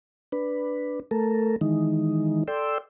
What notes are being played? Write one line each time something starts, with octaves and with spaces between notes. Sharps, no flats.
D4 B4
A3 A4 A#4
D#3 E3 G#3 D#4
A4 D5 G5 C6 E6